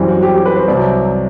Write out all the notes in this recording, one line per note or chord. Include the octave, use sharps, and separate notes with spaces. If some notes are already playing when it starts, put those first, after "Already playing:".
Already playing: F#2 E3 G3 C4
F#4
G4
G4
B4
C5
C2 C3 F#3 D5